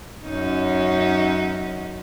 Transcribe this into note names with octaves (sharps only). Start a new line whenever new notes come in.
F#2 C#4 D#4